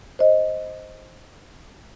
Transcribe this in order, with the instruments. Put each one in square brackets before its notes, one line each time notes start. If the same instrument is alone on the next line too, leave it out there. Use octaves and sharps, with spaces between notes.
[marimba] C5 D#5